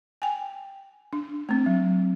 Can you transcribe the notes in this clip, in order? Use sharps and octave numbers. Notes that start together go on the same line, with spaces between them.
G5 G#5
D4
A3 C4
F#3